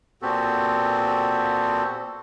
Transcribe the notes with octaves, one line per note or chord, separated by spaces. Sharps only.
A#2 B3 C4 F#4 G4 A4